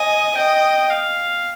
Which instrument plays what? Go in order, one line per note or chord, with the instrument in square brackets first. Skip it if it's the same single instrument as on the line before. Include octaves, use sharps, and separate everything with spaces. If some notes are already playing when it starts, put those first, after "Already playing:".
Already playing: [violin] D#5 [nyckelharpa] G#5
[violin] D#5 [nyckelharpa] G5
[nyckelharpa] F5